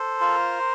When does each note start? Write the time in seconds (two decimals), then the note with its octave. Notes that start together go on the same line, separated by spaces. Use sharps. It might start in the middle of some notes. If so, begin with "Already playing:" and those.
Already playing: A4 C5
0.20 F4 A#4